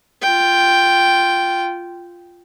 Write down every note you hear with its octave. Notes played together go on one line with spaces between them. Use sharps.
F4 G5